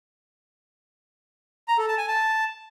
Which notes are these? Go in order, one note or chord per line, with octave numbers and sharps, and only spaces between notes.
A#5
A4
A5
G#5
A5